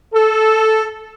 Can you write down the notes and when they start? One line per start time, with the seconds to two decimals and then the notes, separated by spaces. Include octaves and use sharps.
0.13 A4